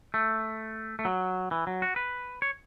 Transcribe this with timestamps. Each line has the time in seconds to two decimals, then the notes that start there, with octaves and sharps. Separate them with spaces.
0.14 A3
0.99 A3
1.05 F#3
1.51 E3
1.67 F#3
1.82 F#4
1.96 B4
2.42 C#5